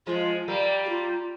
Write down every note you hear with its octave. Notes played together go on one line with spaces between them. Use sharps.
F3 G#3 F4
G3 A#3
G4
F4